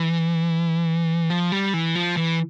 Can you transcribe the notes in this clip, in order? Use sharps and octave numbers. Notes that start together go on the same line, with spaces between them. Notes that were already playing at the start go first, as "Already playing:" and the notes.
Already playing: E3
F3
G3
E3
F3
E3